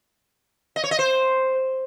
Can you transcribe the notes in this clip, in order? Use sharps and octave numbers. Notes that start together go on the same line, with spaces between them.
D#5
C#5
D#5
C5